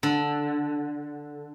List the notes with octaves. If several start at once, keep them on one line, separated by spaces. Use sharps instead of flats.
D3